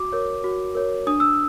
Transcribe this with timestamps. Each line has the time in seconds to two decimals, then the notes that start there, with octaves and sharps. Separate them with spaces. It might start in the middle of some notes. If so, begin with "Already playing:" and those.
Already playing: F#4 D6
0.12 A#4 C#5
0.44 F#4
0.75 A#4 C#5
1.07 D4 D#6
1.20 E6